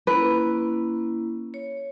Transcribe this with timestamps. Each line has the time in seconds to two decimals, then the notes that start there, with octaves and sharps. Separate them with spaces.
0.07 A#3 C#4 E4 B4
1.54 C#5